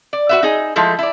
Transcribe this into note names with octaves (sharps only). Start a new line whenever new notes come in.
D5
F#4 B4 E5
D#4 G#4
F3 G#3 A3 E4
E4 D5